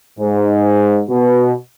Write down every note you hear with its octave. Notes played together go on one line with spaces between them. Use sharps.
G#2
B2